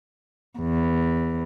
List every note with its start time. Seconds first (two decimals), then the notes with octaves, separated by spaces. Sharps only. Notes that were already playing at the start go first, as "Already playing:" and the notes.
0.59 E2